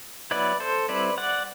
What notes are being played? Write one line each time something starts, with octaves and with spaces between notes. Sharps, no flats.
F#3 B3 E4 B4 D5
A4 C5
G3 C4 E4 B4 D5
D5 F#5